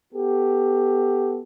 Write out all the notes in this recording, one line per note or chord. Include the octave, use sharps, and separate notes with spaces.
B3 F#4 G4 A4